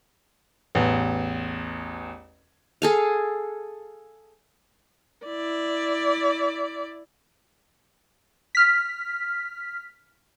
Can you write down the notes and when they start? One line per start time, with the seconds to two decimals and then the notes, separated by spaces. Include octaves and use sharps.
0.75 A1 E2
2.82 G#4 A4 F5
5.25 E4 D5
8.55 F6 B6